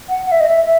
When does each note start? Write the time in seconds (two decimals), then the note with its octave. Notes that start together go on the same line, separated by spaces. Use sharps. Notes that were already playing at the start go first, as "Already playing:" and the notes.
0.08 F#5
0.25 F#5
0.31 E5
0.40 D#5
0.48 E5
0.64 E5